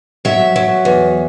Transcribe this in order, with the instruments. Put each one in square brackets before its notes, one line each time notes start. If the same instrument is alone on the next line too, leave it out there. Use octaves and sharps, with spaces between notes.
[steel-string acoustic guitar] F#3 E5
F#3
E2